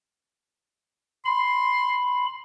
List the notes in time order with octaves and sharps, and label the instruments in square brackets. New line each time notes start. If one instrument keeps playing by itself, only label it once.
[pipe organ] B5 [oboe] C6